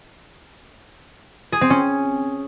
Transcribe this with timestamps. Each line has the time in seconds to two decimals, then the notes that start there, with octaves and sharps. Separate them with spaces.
1.52 G#4
1.61 C4
1.70 C#4